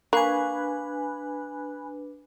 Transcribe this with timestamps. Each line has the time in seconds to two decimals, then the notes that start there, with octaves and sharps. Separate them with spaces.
0.13 A#3 D4 B4 F5 G#5 B5 C#6 F#6